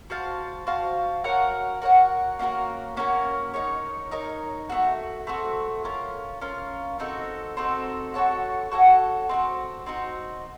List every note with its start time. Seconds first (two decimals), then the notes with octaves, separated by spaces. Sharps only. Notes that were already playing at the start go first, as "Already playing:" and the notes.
0.10 F#4 C5 F5 A5
0.67 F#4 C5 F5 A5
1.24 F#4 A#4 C#5 F#5
1.82 F#4 A#4 C#5 F#5
2.39 A#3 C#4 F#4 A#4
2.97 A#3 C#4 F#4 A#4
3.54 D#4 A#4 C#5
4.11 D#4 A#4 C#5
4.69 A3 C4 F#4
5.27 A3 C4 F#4
5.84 C#4 F4 A#4
6.41 C#4 F4 A#4
6.99 C4 D#4 F#4 A4
7.57 C4 D#4 F#4 A4
8.14 F#4 A4 C#5 F#5
8.71 F#4 A4 C#5 F#5
9.29 C4 D#4 F#4
9.86 C4 D#4 F#4